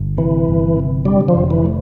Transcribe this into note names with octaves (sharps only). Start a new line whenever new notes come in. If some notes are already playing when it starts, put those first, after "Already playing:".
Already playing: G1
C3 E3
G1
C3
D3 G3
F3
F1
E3
A3